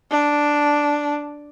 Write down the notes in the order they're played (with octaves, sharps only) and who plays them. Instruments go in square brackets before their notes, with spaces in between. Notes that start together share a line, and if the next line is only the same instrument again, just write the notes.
[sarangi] D4